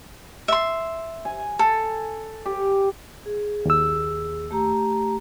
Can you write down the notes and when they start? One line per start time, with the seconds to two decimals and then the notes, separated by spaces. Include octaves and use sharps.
0.48 E5 C6
1.25 G#5
1.59 A4
2.46 G4
3.26 G#4
3.65 D#2 E6
4.51 A3 G4 A#5